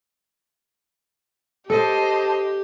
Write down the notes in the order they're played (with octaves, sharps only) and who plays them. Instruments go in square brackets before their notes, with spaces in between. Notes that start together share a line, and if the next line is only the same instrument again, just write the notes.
[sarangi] G4 [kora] A4 [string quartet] C5 D#5 [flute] A5